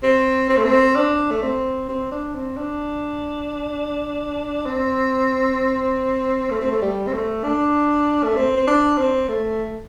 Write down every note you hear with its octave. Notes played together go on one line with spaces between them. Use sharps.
C4
C4
A3
C4
D4
A3
C4
C4
D4
C4
D4
C4
A3
C4
A3
G3
C4
A3
D4
A3
C4
C4
D4
C4
A3